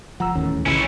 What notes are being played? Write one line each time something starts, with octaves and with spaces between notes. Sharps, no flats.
F1 F3 F#5 A#5 E6
D#1 E2 A2 D#3 C#4
A#1 C#3 E3 C#4 E4